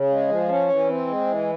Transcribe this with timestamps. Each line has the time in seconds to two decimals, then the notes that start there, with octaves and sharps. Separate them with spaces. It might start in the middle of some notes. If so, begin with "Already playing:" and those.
Already playing: C#3
0.10 G#3
0.29 F3
0.49 C#4
0.69 E3
0.88 C4
1.07 G#3
1.27 E3